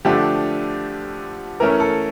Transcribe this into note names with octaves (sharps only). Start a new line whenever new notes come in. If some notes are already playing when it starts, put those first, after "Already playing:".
D3 F3 A3 D4 G4
E3 A3 C#4 A#4
A4